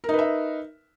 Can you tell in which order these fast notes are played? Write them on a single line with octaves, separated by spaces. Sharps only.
A#4 D#4 B4 E5